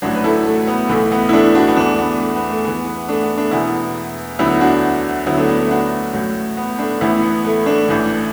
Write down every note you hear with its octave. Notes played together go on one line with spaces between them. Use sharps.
A1 A2 F#3 D4 F#4
B4
E4 A4
A3
B3
B1 A2 E3 A3
B3
E4
A3 D4
D4 F#4
B3
E2 E3 A3 D4
B3
A3
B3
A3
E2 E3 B3
B3
A3 D4
B3
A3 D4
E1 E2 B2 B3 E4
D2 D3 F#3 B3 E4
D4 F#4
D2 D3 F#3 B3 E4
A3 D4
B3
A3
D4 F#4
A1 A2 F#3
B3
A3 D4
A1 A2 E3 B3 E4
B3
A3
A3 D4
A1 A2 E3